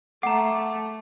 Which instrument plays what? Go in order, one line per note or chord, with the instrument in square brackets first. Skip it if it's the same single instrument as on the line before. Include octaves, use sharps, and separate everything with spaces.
[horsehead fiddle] A3 [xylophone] F#5 A#5 [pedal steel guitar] D6